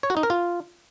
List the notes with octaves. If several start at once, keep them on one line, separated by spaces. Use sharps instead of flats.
C#5
F#4
D#4
A#4
F4